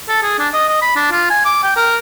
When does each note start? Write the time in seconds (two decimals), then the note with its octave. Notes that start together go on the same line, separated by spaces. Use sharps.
0.09 A4
0.22 G#4
0.39 D4
0.54 D#5
0.69 D#5
0.82 B5
0.96 D4
1.11 F4
1.30 G#5
1.45 D6
1.64 G5
1.77 A#4